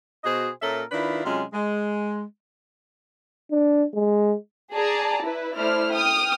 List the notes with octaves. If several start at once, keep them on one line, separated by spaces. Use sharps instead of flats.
B2 F#4 G#4 C5 D#5
A#2 C#4 A4 A#4 E5
D#3 D4 E4 F4 B4
C3 F#3 G#3 C#4 F4
G#3
D4
G#3
G#4 D5 A5 A#5
E4 B4
A3 E4 C5 D5 F6
G5 D#6 F6